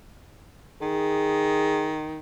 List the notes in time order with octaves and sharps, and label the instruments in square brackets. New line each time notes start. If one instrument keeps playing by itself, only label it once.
[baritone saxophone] D#3 [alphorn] G#4